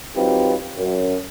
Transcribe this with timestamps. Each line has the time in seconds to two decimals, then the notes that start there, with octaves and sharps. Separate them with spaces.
0.16 F#3 C4 D#4 F4 G4 B4
0.78 F#2